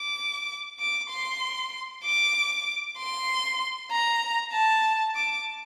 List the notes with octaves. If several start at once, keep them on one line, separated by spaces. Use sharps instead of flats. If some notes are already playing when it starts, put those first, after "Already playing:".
Already playing: D6
D6
C6
D6
C6
A#5
A5
D6